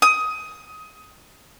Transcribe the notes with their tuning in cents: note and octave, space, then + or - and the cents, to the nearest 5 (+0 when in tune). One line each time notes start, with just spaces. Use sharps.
D#6 +20